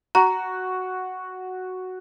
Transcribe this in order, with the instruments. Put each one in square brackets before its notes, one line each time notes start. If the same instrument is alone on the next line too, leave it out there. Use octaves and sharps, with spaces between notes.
[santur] F#4 [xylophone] A#5